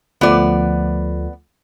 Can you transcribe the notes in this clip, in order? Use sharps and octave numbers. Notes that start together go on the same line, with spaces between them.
D2 F3 A3 B3 D5